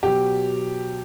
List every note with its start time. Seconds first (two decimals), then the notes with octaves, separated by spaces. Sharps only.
0.03 B2 F#3 G4